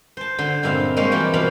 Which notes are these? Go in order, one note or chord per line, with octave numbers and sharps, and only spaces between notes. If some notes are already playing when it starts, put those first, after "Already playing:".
C5 A5
D3 C5 C6
G2 A#2 G#3 C4 E5 F5
G3 G#3 A#3 C5 C#5 F5
E3 F3 G3 D4 G4
B2 F3 A#3 F5 B5